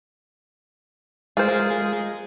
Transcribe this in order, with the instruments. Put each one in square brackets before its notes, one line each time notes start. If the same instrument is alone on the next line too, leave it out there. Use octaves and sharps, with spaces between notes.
[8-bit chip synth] G#3 G#4 [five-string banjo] F4 A#4 C5